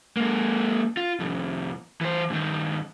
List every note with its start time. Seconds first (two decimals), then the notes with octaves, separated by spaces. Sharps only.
0.17 G#3 A#3
0.97 F4
1.20 C2 F2
2.01 E3 C5
2.30 G2 D#3